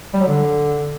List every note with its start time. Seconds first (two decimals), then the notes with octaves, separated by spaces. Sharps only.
0.14 G3
0.20 F#3
0.27 D3